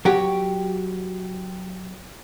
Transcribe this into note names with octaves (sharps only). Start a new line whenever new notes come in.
F#3 F#4 G4